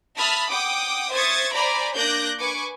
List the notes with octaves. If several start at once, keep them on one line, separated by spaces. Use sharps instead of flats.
E5 A5 B5 D#6 F6
F#5 G5 D6 D#6
C5 E5 C#6 D#6 G#6 A6
C5 D5 G#5 A#5 B5 D6
A#3 D4 D6 F#6 G6 A#6
B4 G#5 C#6 D6 C#7